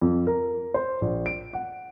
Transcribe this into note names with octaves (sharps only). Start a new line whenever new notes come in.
F2
A#4
C5
A#1
D7
F#5